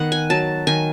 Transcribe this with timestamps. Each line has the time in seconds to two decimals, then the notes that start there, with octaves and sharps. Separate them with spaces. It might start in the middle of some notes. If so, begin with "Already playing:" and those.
Already playing: D#3 B3 F#5
0.12 G#5
0.30 F#3 A5
0.67 D#3 G#5